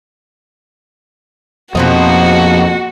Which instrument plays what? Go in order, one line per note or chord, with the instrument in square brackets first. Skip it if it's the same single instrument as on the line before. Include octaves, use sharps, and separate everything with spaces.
[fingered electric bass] F2 [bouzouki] B2 C4 D#4 [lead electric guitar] F3 A#3 [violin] F#4